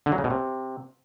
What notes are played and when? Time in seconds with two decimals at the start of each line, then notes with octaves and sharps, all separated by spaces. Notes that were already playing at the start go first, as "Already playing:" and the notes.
0.06 D3
0.12 F#3
0.18 C#3
0.24 B2
0.30 C3